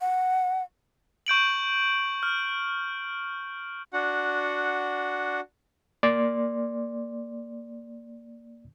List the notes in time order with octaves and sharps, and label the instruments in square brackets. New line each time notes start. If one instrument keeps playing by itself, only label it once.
[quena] F#5
[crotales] C#6 G6 D7 F#7
F6
[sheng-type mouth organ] D4 F#4 F#5
[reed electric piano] A#3 D5 C6